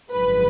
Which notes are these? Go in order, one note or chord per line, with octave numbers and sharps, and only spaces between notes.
G#1 F#2 D3 F3 G#3 B4